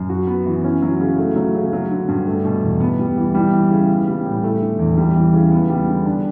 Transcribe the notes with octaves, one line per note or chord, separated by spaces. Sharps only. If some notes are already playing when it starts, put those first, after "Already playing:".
Already playing: F#2
F#4
B3
E3
C#4
F#3
C#3
A3
F#3
C#3
F#3
D3
G2
A3
B2
E2
B3
G3
E3
G3
E3
C#3
B3
G3
A2
A3
D3
E2
G3
E3
C#3
B3
G3
D3
D4